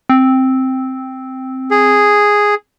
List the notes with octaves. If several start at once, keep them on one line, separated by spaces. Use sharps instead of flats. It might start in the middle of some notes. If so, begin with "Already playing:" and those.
C4
G#4